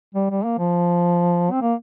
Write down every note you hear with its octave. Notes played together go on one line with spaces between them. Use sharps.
G3
G3
A#3
F3
C4
A#3